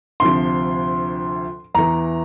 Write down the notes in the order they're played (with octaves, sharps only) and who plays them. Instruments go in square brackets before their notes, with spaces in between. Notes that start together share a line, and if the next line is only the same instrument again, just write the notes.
[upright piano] D2 C3 F3 C6
E2 E3 A#5